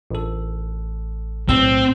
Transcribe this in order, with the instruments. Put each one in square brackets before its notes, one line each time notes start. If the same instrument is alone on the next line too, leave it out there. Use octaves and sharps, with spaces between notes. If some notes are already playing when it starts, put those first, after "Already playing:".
[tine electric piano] A1 A4
[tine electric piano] B1 E6 [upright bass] A2 [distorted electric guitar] C4